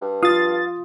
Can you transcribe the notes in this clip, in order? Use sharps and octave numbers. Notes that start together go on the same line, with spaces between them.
G2
F4 F5 D#6 A6